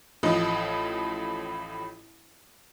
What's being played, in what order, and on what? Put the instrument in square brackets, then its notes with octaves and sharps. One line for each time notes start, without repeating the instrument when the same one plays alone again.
[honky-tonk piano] A1 A2 F3 D#5